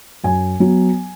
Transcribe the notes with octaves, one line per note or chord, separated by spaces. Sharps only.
F#2 G#5
F#3 B3